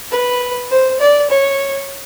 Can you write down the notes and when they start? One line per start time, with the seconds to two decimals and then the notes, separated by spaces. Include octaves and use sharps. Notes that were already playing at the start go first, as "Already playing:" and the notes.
0.11 B4
0.71 C5
1.00 D5
1.30 C#5